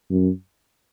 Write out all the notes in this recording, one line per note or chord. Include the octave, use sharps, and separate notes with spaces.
F#2